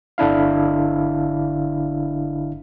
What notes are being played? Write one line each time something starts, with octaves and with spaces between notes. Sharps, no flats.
G1 D3 D4 E4 F5